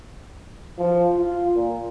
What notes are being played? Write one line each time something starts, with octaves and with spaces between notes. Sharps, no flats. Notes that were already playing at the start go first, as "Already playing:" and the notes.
F3
F4
A#2